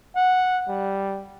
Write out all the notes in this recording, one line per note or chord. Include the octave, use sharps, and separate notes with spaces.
F#5
G3